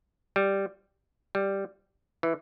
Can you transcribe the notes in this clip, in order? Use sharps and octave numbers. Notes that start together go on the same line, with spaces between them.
G3
G3
E3